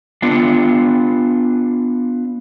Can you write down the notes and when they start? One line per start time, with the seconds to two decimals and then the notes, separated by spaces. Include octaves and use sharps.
0.22 B3 D4 F4